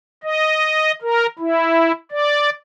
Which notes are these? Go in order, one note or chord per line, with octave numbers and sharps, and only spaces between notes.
D#5
A#4
E4
D5